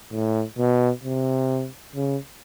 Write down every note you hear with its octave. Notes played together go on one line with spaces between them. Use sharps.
A2
B2
C3
C#3